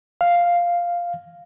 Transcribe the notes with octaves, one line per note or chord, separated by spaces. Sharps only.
F5